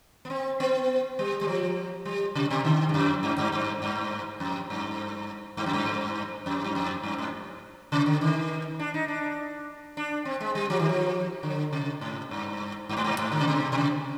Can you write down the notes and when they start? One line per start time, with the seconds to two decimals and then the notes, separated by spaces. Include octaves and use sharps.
0.25 B3
0.30 C4
0.60 B3
1.19 G3
1.41 G3
1.48 F3
2.05 G3
2.35 C3
2.50 B2
2.65 D3
2.89 G2
2.94 F2
3.23 G2
3.38 G2
3.52 G2
3.82 G2
4.40 F2
4.70 G2
5.57 G2
5.66 F2
5.73 G2
6.46 F2
6.64 G2
6.75 F2
7.03 G2
7.18 G#2
7.92 C3
8.06 D3
8.21 D#3
8.80 D4
8.94 D#4
9.08 D4
9.97 D4
10.25 C4
10.41 G#3
10.55 G3
10.70 F3
10.79 D#3
10.89 F3
11.43 D3
11.73 C3
12.01 G#2
12.31 G2
12.89 G2
12.97 G#2
13.04 G2
13.19 G#2
13.32 D3
13.40 C3
13.47 B2
13.72 B2
13.78 C3